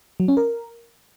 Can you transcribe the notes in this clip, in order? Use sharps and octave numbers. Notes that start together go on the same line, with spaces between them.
F#3
C#4
A#4